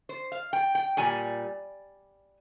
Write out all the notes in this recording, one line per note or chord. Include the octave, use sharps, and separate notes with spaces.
C5
F5
G5
G5
A#2 G3 G#5